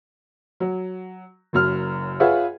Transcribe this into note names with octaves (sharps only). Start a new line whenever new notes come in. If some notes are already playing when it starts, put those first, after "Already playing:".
F#3
F#1 F#2 F6
F4 G#4 B4 C#5 E5 F#5